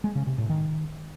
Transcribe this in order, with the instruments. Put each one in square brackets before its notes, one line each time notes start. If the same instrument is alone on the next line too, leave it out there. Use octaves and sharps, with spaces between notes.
[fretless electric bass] G#3
C#3
C3
A2
D#3